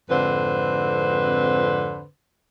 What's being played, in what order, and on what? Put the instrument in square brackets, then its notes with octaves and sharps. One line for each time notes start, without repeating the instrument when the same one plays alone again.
[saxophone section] F2 G#2 D3 C4 B4 C5